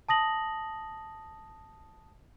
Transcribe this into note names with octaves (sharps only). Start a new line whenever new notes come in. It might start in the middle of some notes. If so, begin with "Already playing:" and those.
A5 D#6 A#6 F#7